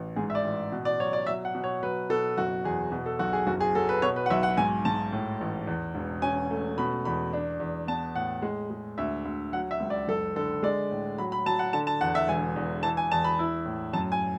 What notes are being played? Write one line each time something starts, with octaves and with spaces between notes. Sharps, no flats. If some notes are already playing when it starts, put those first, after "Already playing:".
Already playing: A1
G#2 G#4
E5
D5
A1
B2
D5
F#3 C#5
D5
F#3 E5
F#5
B2
C#5
F#3 B4
B2 A4
F#1 F#4
E2 G#4
B2
A4
B1 F#4
G#4
F#1 F#4
G#4
F#3 A4
B4
B2 C#5
B4
F#5
B1 E5
F#5
G#2 G#5
G#2 A5
A2
A1
E2
E1
C#4 G#5
A3
B2 B5
E2 B5
D4
E2
B3 A5
A2 F#5
G#3
G#3
D2 E5
D2
F#3 F#5
E5
C#2
D5
F#1 A4
D3 A4
G#3 D5
A2
F#3 B5
B5
F#3 A5
F#5
D3 A5
A5
E2 F#5
E5
E1 G#5
E2
E3 A5
G#5
E2 A5
B5
E4
A2
F#2 A5
G#5